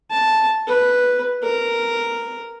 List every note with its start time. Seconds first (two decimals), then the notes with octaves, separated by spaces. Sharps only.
0.11 A5
0.67 B4
1.43 A#4